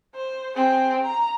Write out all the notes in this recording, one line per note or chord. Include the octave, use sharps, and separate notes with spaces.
C5
C4 G#4
A#5